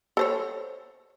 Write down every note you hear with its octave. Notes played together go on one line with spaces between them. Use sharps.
A4 C5 C#5